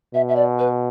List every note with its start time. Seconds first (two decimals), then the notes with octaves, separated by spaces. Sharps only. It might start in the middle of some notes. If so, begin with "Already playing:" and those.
0.14 B2 E5
0.29 E5
0.36 D5
0.59 B4